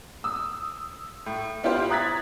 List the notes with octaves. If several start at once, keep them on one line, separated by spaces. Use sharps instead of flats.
D#6 E6
A2
B3 E4 F4 G4 C5 F5
A#5 D#6 F#6 G#6 A6 B6